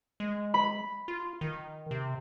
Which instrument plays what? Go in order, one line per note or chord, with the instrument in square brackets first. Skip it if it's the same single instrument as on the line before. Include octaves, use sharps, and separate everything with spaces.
[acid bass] G#3
[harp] B5
[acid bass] F4
D#3
C3